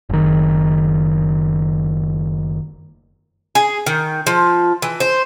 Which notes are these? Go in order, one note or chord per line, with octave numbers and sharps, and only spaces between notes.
F#1 D#3
G#4
D#3
F3
E3
C5